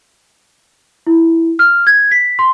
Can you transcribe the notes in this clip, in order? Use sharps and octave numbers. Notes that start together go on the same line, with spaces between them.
E4
F6
G#6
B6
C6